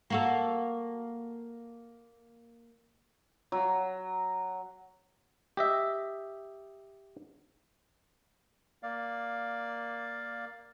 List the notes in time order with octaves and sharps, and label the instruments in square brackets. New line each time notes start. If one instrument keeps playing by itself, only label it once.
[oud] A#3 F#4 A4
[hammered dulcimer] F#3
[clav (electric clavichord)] G4 D#5 E5
[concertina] A#3 D5 F5